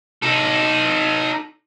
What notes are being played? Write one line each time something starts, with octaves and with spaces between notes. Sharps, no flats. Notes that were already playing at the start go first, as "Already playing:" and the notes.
D#4 A4